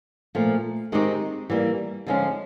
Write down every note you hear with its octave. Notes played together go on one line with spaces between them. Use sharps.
A#2 F3 A3
D#3 G#3 C4 D#4 G4
E3 G3 A#3
D3 F3 G#3 C#4 F4